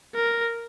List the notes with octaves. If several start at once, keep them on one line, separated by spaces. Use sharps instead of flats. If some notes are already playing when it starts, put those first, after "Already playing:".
A#4